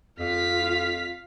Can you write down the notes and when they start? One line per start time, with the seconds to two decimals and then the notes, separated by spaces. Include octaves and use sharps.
0.19 F2 F4 F5 B6